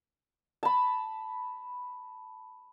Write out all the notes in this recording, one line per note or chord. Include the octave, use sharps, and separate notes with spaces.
A5 B5